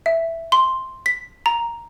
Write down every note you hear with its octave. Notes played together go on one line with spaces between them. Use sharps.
E5
C6
B6
A#5